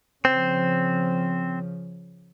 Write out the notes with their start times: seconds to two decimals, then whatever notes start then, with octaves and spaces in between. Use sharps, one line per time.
0.25 C#3 F3 C4